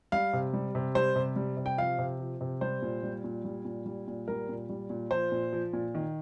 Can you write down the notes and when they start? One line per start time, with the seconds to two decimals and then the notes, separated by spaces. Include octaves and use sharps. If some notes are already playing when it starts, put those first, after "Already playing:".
0.12 G3 F5
0.33 C3
0.54 G3
0.75 C3
0.95 G3 C5
1.16 C3
1.36 G3
1.57 C3
1.66 G5
1.78 F3 F5
1.99 C3
2.20 F3
2.41 C3
2.61 G3 C5
2.82 A#2
3.03 G3
3.24 A#2
3.44 G3
3.65 A#2
3.86 G3
4.07 A#2
4.28 G3 A#4
4.49 A#2
4.69 G3
4.90 A#2
5.11 F3 C5
5.32 A#2
5.53 F3
5.73 A#2
5.95 D#3